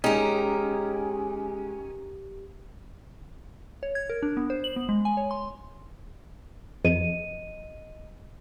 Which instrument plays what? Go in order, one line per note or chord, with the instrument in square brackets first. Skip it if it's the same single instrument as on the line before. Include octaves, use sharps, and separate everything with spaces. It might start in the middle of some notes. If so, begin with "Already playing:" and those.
[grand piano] G#3 [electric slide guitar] C#4 [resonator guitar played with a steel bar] D#4 [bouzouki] G4 A#4
[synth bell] C#5
G#6
A#4
D4
B3
C5
F#7
B3
G#3
G#5
C#5
C6
[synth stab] F2 [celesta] D#5 D#7